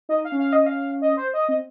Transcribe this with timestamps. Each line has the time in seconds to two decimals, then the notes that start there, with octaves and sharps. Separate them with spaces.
0.09 D#4 D#5
0.25 F5
0.32 C#4
0.39 F5
0.53 D#5
0.66 F5
1.02 D#5
1.17 C5
1.34 D#5
1.48 C4 D#5